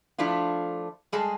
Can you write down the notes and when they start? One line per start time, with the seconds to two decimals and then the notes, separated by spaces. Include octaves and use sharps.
0.18 F3 A3 D4 E4 F4
1.12 G3 G#3 G#4 A5